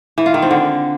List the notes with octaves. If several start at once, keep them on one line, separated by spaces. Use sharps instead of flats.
E3
F4
D#3
C4
D3